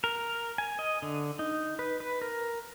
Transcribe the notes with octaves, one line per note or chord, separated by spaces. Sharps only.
A#4
G#5
D#5
D3
D#4
B4
B4
A#4